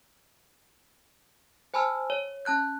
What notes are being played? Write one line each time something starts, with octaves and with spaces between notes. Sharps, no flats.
C5 G#5 A5 B5 E6 F6
C#5
C#4 A5 F#6 G6